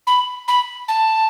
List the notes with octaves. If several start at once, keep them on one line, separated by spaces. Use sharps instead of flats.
B5
B5
A5